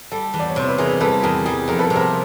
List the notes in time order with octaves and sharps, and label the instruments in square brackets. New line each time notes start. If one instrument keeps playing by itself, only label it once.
[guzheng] G3 [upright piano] A4
[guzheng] E2
[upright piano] D5
C#5
[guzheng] C3 [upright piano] C5
[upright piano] B4
[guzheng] E3 [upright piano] G#4 A#4
[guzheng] G3 [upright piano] A4 B4
[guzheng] E2 [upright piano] G#4 A#4
[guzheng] G3 [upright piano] G#4
[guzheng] F2 [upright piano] A#4
[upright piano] A4 B4
[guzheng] C3
[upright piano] A#4 C5